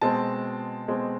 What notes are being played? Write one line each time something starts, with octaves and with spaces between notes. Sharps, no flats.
B2 G#3 C4 A5
B2 G#3 C4